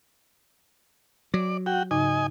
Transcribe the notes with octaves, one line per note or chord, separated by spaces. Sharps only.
F#3 D5
F#4 G5
G#2 C#3 D#4 D#5 G#5